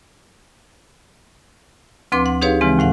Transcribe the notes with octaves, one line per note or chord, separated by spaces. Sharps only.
D2 F3 C4 B4 C6 D6
F#5
D#4 G4 G#4 B4 C#5 F5
C#3 E3 G#3 C4
D#2 A2 F5 F#5